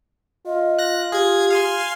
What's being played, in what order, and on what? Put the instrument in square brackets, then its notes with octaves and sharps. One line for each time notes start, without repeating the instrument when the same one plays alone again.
[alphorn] F4 [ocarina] D#5
[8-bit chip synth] F#6 A#6
[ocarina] G4 [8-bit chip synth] G#4 G#6
[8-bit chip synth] F5 G#5 C6